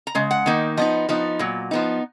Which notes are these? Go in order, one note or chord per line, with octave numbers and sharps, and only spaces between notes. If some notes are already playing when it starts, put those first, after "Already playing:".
A#5
C#3 G#3
F#5
D#3 A#3 D#4
F3 B3 D#4 D#5
F3 B3 D#4
A#2 F#3
F3 B3 D#4